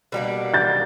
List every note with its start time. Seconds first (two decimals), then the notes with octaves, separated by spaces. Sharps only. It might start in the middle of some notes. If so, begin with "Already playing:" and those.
0.12 B2 G3 A#3 D4
0.54 G6 A6